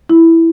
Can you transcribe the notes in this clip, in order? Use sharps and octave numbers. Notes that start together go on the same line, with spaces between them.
E4